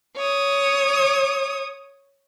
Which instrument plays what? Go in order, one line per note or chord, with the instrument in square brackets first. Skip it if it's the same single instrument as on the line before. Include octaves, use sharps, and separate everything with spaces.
[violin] C#5 D#6